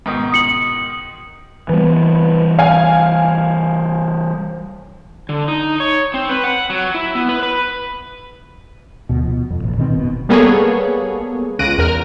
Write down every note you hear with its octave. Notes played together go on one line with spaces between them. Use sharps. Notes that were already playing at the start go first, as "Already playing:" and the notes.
G#2 B2 D#3
D#6 C#7 F#7
E3 G3 B3
F5 G#5
D3
D#4
C#5
C4
B4
F#5
F#3
E4
B3
B4
B4
D2 B2
B2 F3
F2
A1
B2 D#3 C4
F#1 B2
G3 A#3 B3 G#4 A4 C#5
C#2 F#6 A#6 D7 D#7
E2 A#4 F6